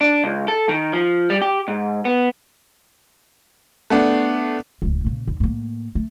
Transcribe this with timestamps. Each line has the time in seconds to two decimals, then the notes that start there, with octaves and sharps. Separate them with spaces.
0.01 D4
0.24 C#2
0.48 A4
0.69 D#3
0.93 F3
1.30 G3
1.42 G4
1.68 G#2
2.05 B3
3.90 A3 B3 D4
4.82 D1 C#2
5.04 A#2 C#3
5.27 D#2
5.40 A2 A#3
5.95 A3